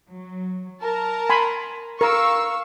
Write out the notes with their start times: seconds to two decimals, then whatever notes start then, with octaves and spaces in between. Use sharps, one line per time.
0.13 F#3
0.82 A#4 A5 A#5
1.30 G#5 B5 C6
2.01 A#4 F5 C#6 E6